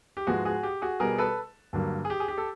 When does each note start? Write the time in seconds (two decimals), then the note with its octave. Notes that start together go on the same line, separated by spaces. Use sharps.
0.17 G4
0.27 G#2 F3 G#3 B3 F#4 G#4
0.45 F#4 G#4
0.63 G4
0.82 F#4 G#4
1.00 B2 G3 B3 G#4 A#4
1.18 A4 B4
1.73 G2 D3 F#3 A#3
2.05 G#4
2.10 G4
2.20 G#4
2.28 G4
2.38 A4